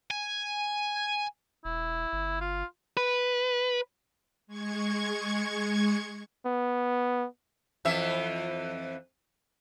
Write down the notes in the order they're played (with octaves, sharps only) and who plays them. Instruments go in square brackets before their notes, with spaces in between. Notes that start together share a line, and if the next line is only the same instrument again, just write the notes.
[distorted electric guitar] G#5
[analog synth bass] E1 [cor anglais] E4
[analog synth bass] G1
[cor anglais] F4
[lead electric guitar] B4
[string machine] G#3 C#6 G#6
[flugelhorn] B3
[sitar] F2 E3 E5